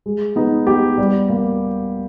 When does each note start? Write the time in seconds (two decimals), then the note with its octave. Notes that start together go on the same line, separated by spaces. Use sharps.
0.06 G#3
0.36 B3 D#4
0.67 B3 G4
0.98 G3
1.30 A#3